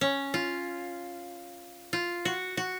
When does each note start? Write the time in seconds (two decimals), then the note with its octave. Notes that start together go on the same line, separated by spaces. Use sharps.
0.01 C#4
0.34 F4
1.93 F4
2.25 F#4
2.57 F#4